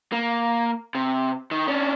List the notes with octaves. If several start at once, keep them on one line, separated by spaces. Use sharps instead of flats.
A#3
C3
D#3
C#4 D4